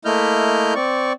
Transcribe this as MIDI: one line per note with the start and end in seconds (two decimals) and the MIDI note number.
0.05 0.74 57
0.05 0.74 58
0.05 0.74 64
0.05 0.74 75
0.05 0.74 89
0.05 0.74 91
0.75 1.13 60
0.75 1.13 74
0.75 1.13 85